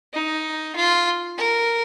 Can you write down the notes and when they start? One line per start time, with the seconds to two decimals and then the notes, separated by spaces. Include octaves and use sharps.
0.13 D#4
0.76 F4
1.38 A#4